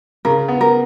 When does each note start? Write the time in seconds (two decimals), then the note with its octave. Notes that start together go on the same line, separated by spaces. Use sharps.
0.25 C#3 A#4
0.48 B3
0.61 A#4